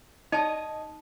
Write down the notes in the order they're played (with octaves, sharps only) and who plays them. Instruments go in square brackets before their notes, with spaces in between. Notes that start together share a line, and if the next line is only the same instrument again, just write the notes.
[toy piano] D#4 A5 [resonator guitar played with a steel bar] C#5 D#5